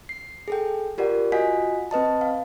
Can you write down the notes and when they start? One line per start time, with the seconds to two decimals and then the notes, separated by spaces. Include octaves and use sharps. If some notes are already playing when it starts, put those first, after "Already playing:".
0.09 C7
0.48 G#4 A4 G5
0.98 F4 G4 A#4 D5 F#5
1.32 F4 F#4 D#5 F#5 G#5 B6
1.91 C4 B4 D#5 A5
2.21 F5